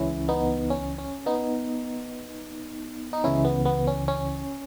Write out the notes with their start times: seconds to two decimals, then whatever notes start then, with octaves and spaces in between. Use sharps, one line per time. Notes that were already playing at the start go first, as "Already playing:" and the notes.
Already playing: C#2 C#3 E3 C#4 E4
0.29 B3 D#4
0.70 C#4
0.98 C#4
1.26 B3 D#4
3.13 D#4
3.24 C#2 C#3 E3 C#4 E4
3.45 B3
3.65 B3
3.87 C#4
4.08 C#4